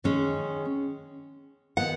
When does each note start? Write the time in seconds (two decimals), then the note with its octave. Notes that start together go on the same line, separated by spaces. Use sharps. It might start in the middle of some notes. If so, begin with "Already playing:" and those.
0.04 D#3 G#3 C#4
1.77 D#3 B3 F#5